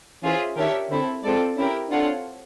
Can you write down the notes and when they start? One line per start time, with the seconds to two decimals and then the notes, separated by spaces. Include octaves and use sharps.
0.23 E3 C#4 F4 G#4 C5 E5
0.57 D#3 D4 G4 A#4 C#5 E5
0.90 D3 C4 E4 A4
1.23 G#3 C4 F4 A4 D5
1.57 C#4 E4 G4 A#4
1.90 C4 D4 F4 A4 C#5 F#5